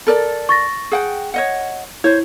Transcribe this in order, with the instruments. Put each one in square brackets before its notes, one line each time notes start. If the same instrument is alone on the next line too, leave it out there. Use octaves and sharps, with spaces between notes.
[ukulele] A4 A#4 D5
[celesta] C#6 A6 A#6
[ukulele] G#4 F#5 G5
C#5 D#5 F#5
[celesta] E4 [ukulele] C5 C#5